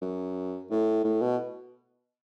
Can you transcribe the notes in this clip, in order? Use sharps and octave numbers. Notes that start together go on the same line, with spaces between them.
F#2
A2
A2
B2